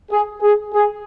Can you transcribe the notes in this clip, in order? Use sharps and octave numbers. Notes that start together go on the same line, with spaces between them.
G#4
G#4
G#4